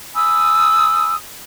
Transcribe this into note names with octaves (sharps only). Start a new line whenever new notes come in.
G#5 B5 D#6 E6